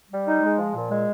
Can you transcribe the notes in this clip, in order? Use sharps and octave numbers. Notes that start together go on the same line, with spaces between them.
G3
D#4
G#3
F3
A#2
G#3